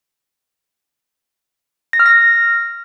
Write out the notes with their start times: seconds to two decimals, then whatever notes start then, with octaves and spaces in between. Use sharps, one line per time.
1.93 A#6
2.00 F6
2.06 A#6